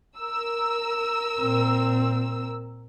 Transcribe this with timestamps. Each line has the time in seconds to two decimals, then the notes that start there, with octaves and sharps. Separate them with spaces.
0.19 A#4 E6
1.40 A#2 C4